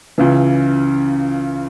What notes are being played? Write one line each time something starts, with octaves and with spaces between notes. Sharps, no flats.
C#2 C#3 E3